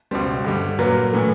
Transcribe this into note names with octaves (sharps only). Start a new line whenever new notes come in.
C#2 B2 G3 C5
G2 D3 G3
A#2 F#3 A#3 B4
A2 E3 A3